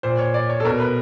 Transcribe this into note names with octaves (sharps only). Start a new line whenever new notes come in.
A#2 C5
C#5
D5
C#5
A4
B2 A#4
B4